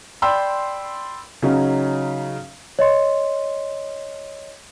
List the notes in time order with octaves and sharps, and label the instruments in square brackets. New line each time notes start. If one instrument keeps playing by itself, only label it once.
[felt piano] D5 G5 B5 C6 E6
C#3 F#3 C#4 D#4
[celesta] C#5 D#5 C6